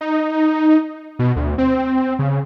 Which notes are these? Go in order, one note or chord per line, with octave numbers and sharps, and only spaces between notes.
D#4
B2
D2
C4
C#3